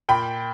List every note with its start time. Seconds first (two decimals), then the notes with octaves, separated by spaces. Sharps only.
0.09 A#2 G5 B5